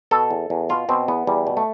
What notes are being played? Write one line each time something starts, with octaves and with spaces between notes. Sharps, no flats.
B2 A4
E2
E2
B2 F4
B2 C4
E2 B3
E2 G3
B2
A3